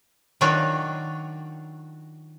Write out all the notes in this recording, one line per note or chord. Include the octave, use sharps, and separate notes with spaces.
D#3 F#3 D4 F4 F#4 G5